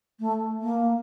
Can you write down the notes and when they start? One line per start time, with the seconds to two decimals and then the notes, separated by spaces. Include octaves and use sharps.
0.19 A3
0.61 A#3